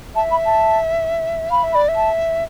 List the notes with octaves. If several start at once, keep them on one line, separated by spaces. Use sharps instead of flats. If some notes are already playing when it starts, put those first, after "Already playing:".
E5 A5
B5
A5
F5 B5
E5
B5
D5
E5
A5